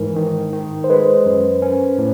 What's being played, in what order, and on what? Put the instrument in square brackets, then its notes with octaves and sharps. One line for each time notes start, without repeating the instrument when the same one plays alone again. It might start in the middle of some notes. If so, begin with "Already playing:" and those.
Already playing: [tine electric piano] G#2 E3 [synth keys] A#4
[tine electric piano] D#3
D#3
[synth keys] C5
[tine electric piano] G#3 [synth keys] B4
[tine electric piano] F#2
C#4
A2